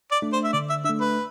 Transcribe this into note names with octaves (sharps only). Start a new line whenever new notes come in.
D5
A3 D4
C5
E5
D3 D5
E5
A3 D4 E5
B4